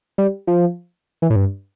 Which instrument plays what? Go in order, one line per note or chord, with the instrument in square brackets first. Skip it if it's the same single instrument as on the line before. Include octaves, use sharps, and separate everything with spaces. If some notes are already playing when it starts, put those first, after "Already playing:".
[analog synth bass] G3
F3
E3
A2
G2